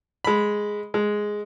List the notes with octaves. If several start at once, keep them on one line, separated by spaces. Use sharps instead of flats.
G#3 B5
G#3